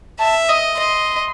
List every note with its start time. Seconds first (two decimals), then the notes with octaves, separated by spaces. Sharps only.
0.20 E5 A5
0.49 D#5 D#6
0.78 D#5 C6